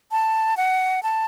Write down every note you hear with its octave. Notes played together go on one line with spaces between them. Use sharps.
A5
F#5
A5